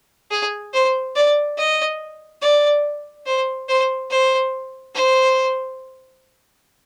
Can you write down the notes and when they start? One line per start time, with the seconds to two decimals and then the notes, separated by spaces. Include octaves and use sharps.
0.31 G#4
0.74 C5
1.16 D5
1.58 D#5
2.42 D5
3.26 C5
3.69 C5
4.11 C5
4.95 C5